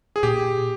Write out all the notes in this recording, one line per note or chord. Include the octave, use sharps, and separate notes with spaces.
G#4
A#2 G4